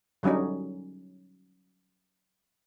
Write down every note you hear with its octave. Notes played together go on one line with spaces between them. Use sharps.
D3 F#3 G3 C#4 D#4